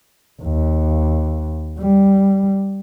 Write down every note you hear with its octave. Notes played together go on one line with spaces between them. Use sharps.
D#2
G3